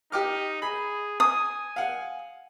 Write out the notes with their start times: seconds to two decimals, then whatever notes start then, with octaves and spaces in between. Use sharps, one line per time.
0.12 D#4 G4 D6 F6
0.62 G#4 B5
1.20 G#5 D#6
1.76 F5 F#5